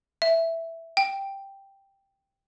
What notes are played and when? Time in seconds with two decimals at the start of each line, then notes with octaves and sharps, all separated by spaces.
0.22 E5
0.97 G5